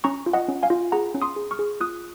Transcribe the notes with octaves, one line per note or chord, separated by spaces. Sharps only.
C#4 A#5 C#6
F4
D#5 F#5
C#4
F5 G#5
F4
G#4 F#5 A#5
C#4
C6 D#6
G#4
C#6 F6
G#4
F4 D#6 F#6